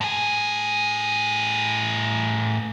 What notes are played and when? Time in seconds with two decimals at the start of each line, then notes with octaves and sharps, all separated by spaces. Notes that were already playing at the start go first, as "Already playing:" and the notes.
0.01 A2 G#4